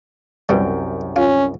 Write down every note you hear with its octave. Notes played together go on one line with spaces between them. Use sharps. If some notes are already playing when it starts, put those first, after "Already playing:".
C2 F#2 B2 G3 G5
C#4 F4